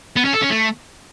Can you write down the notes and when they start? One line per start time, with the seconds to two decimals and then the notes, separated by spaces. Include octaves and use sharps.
0.16 B3
0.25 C#4
0.33 A4
0.42 C#4
0.50 A3